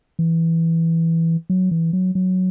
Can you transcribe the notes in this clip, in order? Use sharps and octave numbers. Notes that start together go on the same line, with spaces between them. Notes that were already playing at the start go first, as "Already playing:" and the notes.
E3
F#3
E3
F#3
F#3